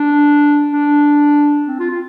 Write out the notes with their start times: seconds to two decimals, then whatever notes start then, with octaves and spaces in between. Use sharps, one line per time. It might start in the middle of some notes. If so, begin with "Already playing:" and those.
Already playing: D4
0.72 D4
1.68 C4
1.79 F4
1.91 F4